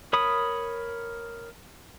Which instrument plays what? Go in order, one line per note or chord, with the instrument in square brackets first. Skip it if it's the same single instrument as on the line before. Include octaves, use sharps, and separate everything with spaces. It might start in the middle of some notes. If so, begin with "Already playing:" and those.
[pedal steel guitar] A#4 C#5 B5 D#6